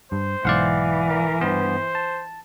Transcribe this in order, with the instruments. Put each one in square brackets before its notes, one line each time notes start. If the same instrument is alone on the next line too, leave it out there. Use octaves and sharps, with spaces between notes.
[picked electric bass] G2 [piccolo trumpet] C5
[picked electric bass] B1 G#2 [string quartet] E3 [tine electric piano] D5 F5 F#5
[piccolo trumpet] A#4
[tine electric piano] G2 B3 [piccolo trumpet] C5
[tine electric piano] A5